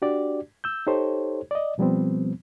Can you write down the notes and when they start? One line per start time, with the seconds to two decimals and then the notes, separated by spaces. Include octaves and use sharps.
0.02 D4 F#4 G4 D5
0.64 E6 G6
0.87 D#4 G4 A4 C5 C#5
1.51 D5 D#5
1.78 B2 F3 G3 B3 C4